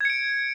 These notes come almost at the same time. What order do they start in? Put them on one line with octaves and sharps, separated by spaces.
G#6 C#7 D7